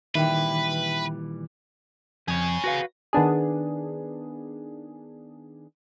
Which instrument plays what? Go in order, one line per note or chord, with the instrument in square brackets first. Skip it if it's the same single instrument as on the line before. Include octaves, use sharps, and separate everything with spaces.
[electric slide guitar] A#2 E3 G3 [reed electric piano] D#3 [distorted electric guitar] B4 [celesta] E5 G5
[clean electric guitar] F2 [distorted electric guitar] G#4 C#5
[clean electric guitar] F#4 B4 F5
[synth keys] D#3 B3 D4 G#4